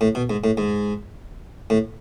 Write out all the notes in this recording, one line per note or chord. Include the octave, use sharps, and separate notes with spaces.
A2
B2
G#2
A2
G#2
A2